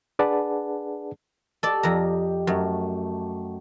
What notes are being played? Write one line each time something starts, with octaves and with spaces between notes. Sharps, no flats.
D4 G#4 B4 D5 F#5 A5
G4 A4 D5 D#5
F2 A#5
F#2 F#3 A3